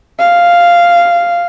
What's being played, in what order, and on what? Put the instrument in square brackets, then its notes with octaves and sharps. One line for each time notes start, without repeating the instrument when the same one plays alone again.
[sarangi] F5